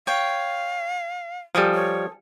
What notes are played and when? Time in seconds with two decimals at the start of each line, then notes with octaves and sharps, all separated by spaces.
0.07 C#5 F5 G5
1.55 F3 G3 A4 G#5 D#6
1.74 C#5